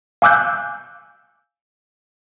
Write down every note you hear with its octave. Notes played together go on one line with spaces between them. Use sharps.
F5 G#5 D6 E6 F#6 G6